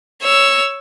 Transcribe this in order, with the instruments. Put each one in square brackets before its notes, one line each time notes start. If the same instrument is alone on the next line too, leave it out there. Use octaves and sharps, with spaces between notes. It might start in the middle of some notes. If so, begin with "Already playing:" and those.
[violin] C#5 E6